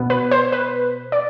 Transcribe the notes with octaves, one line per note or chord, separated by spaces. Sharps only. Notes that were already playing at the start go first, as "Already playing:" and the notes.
Already playing: B2 B3
B4
C5
B4
D5